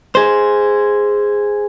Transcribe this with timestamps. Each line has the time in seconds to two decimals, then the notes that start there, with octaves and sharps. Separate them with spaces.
0.15 G#4 C5